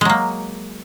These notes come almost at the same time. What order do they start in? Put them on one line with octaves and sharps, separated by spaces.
G#3 F#3 A#3